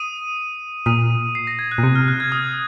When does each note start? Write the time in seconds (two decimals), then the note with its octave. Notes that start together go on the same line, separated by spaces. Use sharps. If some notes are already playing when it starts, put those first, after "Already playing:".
Already playing: D#6 D#7
0.86 A#2 D#6 D#7
1.35 C7
1.47 A#6
1.59 G#6
1.72 F#6
1.78 A#2
1.83 C3
1.96 F6
2.08 F#6
2.20 G#6
2.32 D#6